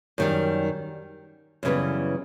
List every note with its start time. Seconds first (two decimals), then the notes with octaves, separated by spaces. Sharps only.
0.18 F#2 D#3 G3
1.63 F#2 C#3 E3 G3 B3